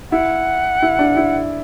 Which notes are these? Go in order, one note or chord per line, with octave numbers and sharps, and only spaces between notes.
E4 F#5
E4
D4
E4